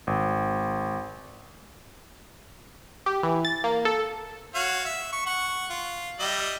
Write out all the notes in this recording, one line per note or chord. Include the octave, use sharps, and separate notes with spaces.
G#1
G4
E3
A6
A#3
A4
F#4 C#5 F5
E5
C#6
F#5 C#6
F4
G3 D#5 E5